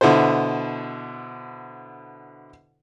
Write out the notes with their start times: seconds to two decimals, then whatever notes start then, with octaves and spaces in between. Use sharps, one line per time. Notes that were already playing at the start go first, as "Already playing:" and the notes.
0.01 B2 D3 E4 A4 C5